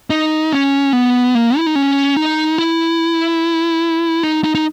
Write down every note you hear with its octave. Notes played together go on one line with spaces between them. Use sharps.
D#4
C#4
B3
A#3
E4
D#4
C#4
D#4
E4
D#4
D#4
D#4